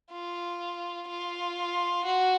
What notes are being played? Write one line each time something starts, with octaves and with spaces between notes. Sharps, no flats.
F4
F4
F#4